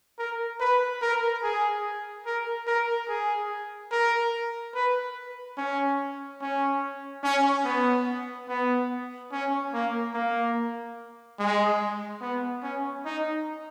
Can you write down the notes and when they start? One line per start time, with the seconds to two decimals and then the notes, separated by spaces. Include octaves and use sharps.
0.18 A#4
0.60 B4
1.02 A#4
1.43 G#4
2.26 A#4
2.67 A#4
3.09 G#4
3.91 A#4
4.75 B4
5.57 C#4
6.41 C#4
7.24 C#4
7.65 B3
8.48 B3
9.32 C#4
9.73 A#3
10.14 A#3
11.39 G#3
12.21 B3
12.63 C#4
13.05 D#4